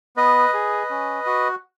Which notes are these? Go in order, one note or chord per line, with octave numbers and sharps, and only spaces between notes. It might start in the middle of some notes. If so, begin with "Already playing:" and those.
B3 B4 D#5
G#4
C#4
F#4